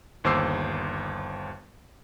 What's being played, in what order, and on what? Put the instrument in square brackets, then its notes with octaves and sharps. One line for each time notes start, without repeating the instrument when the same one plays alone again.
[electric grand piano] G1 D#2 C5 D6 E6 C7